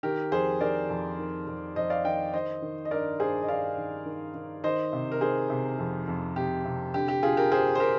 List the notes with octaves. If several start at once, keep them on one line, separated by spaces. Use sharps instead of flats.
D#3 G4 A#4
F2 G#4 C5
D#3 A#4 D5
F2
D#3
F2
F2 C5 D#5
D5 F5
D#3 D#5 G5
D#3 C5 D#5
D#3
D#5
G2 A#4 D5
G2 G#4 C5
D#5
G2 D5 F5
D#3
D#3
D#3
D#3 C5 D#5
C3
A#4
D#3 G#4 C5
C3
F2
F2
C3 G4
C3
D3 G4
G4
D3 F4 G#4
G4 A#4
G2 G#4 C5
C5
G4 A#4